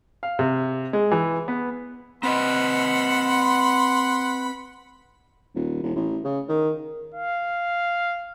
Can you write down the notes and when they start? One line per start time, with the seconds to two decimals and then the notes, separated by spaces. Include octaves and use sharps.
0.23 F5
0.39 C3
0.93 G#3
1.11 E3
1.48 B3
2.23 C4 B4 D#5 F#5 B5 C6
5.55 D#1
5.83 E1
5.95 A1
6.24 C#3
6.48 D#3
7.14 F5